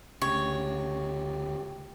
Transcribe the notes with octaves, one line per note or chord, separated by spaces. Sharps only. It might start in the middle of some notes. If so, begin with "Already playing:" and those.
D2 C#3 G4 C#5